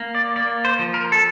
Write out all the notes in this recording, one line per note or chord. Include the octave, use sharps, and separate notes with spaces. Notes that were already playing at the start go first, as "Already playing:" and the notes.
Already playing: A#3
D5
A#3 D5
C5
F3
A#4
A4